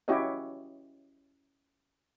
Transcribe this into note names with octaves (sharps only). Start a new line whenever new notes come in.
C#4 E4 F#4 G4 C#5 D#5